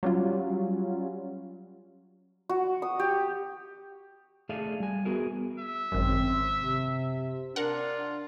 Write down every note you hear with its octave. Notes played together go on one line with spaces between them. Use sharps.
F#3 G3 C#4 F4
F#4
D#6
G4
A3 G#4 A4 D5 E5 F5
G3 G#5
B3 F#4 G#4 A#4
E5
G#1 F#2 C4
C3
D4 F4 A#4 F#5